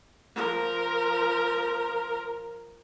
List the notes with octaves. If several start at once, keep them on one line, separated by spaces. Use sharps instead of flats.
F3 A#4